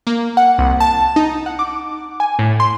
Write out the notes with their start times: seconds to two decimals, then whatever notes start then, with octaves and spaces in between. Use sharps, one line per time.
0.07 A#3
0.37 F#5
0.59 C2
0.80 A5
1.16 D#4
1.46 F#5
1.59 D6
2.20 G#5
2.39 A2
2.60 C6